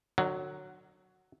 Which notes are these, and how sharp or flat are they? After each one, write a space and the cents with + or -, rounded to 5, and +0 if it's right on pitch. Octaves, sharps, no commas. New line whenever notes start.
D3 +45 F#3 +0